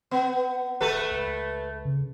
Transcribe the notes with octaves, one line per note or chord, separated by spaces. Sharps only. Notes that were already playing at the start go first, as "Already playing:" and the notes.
B3
D1 A3 A4 B4
C#2
C#3